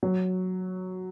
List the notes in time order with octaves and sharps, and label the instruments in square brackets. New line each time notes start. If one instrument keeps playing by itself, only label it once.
[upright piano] F#3